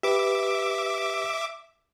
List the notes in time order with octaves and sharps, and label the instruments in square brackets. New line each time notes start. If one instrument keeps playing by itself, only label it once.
[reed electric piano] G4 B4 [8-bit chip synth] E5 D6